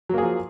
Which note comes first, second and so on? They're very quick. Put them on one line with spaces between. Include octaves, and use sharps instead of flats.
F#3 A#3 G#4 F3